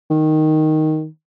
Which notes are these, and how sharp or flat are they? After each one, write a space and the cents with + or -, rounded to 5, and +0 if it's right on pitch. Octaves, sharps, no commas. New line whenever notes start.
D#3 +0